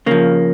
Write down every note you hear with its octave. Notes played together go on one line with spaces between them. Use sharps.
C#3 F3 A#3